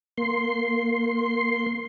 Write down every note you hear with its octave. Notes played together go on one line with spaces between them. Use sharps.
A#3 C6